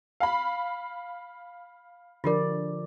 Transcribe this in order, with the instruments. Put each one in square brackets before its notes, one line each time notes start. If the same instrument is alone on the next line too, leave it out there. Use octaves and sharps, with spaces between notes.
[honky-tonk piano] F5 B5
[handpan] D3 F3 D5 [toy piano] F4 G4 A#4